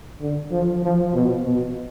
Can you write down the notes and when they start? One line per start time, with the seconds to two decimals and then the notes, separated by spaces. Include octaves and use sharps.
0.21 D3
0.52 F3
0.83 F3
1.14 B2
1.44 B2